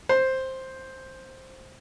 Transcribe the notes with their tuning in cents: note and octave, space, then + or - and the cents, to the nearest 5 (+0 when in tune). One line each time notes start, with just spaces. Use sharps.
C5 +5